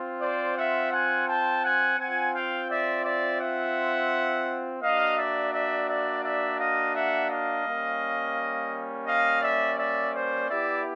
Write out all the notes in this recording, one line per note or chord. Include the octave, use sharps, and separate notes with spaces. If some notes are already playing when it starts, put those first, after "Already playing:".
Already playing: C4 F4
C5 D5
E5 F#5
F#5 G#5
G5 A5
F#5 G#5
C4 F4 F#5 G#5
F5 G5
D5 E5
D5 E5
E5 F#5
A#3 D4 F#4 D#5 F5
D5 E5
D5 E5
D5 E5
D5 E5
D#5 F5
E5 F#5
D#5 F5
G3 A#3 C#4
D#5 F5
D5 E5
D5 E5
C5 D5
B3 E4 G4 D5 E5